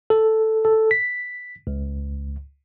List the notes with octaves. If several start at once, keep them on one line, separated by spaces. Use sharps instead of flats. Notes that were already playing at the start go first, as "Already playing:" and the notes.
A4
A4
B6
C#2